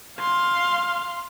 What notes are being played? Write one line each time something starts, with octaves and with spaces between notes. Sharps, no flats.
F5 C6